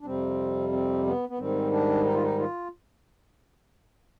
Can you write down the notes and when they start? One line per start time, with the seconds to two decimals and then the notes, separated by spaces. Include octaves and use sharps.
0.01 D4
0.05 F2 C3 G3 C4
0.72 C4
1.06 B3
1.29 B3
1.38 G#2 D#3 G3 C4
1.72 D4
2.05 D#4
2.14 F4
2.24 D#4
2.38 F4